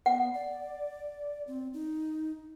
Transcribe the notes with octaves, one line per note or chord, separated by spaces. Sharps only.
B3 F#5
D5
C4
D#4